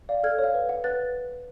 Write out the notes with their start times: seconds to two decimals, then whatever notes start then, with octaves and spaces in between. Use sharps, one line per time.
0.09 D5 F5
0.23 A4 F6 G#6
0.38 C#5
0.44 F5
0.54 B4
0.69 F#5
0.84 B4 F#6 A6